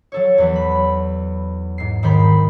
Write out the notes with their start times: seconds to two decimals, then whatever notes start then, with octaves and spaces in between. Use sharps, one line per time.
0.12 F#3 A4 C#5
0.38 E2 F#3 B4
0.56 B5
1.78 G#2 C7
2.03 G#2 D#3 G3 A#4 C5 B5